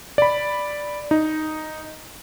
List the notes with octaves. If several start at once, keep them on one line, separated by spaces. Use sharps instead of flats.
D5 B5
D#4